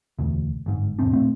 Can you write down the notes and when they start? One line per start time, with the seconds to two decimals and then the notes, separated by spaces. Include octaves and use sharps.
0.19 E1 D2
0.66 G1 G#2
0.99 E1 G#2 C4 D4
1.13 A#2 A3 C4